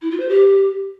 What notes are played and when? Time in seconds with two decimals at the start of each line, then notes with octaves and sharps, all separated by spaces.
0.01 E4
0.10 F4
0.19 C5
0.28 G4